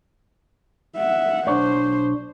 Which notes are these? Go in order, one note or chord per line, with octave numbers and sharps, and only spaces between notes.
E5 F#5
B1 D4 C5 C#5